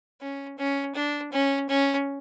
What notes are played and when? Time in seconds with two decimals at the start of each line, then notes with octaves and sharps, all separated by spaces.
0.21 C#4
0.58 C#4
0.95 D4
1.32 C#4
1.69 C#4